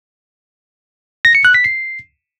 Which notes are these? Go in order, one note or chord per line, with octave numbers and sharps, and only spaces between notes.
A#6
C#7
F#6
B6
C7